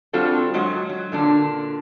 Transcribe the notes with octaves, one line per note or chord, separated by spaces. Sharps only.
G3 C4 D4 F4 F#4 A4
F2 F#3 G#3 F#4 F#5
F#3
A#2 D3 D4